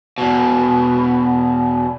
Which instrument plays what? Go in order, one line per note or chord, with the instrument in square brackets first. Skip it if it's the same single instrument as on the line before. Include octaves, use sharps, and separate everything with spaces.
[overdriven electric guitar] E2 B2